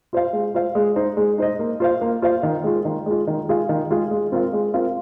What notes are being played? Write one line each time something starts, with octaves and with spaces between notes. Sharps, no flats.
F4 C5 F5
G#3
F4 C5 F5
G#3
D#4 C5 D#5
G#3
D#4 C5 D#5
A#3
F4 C5 F5
A#3
F4 C5 F5
D#3
G#3 F4
D#3
G#3 F4
D#3
G#3 F4 G#4 F5
D#3
G#3 F4 G#4 F5
G#3
C4 F4 A#4 F5
G#3
C4 F4 A#4 F5